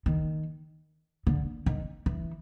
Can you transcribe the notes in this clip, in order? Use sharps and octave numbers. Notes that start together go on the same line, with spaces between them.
D#3
D3
D#3
E3